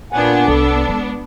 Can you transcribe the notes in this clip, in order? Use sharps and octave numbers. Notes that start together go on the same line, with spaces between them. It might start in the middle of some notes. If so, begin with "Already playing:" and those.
A#2 B3 D4 F#5 G#5
C2 A4
G#3